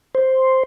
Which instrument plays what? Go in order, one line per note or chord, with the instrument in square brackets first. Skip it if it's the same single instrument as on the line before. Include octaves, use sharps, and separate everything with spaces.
[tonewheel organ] C5